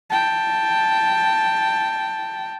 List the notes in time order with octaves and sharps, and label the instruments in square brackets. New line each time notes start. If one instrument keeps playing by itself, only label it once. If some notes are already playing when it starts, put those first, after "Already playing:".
[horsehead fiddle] G5 A5